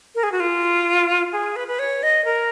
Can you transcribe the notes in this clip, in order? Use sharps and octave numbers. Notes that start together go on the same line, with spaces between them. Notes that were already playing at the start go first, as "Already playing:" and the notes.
A#4
G#4
F#4
F4
G#4
B4
B4
C#5
D#5
A#4